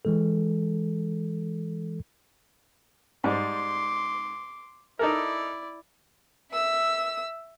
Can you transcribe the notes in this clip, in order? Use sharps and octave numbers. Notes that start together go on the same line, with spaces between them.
E3 G#3 A4
G#2 G3 C6 D6
D#4 E4 A4 A#4 D5
E5 E6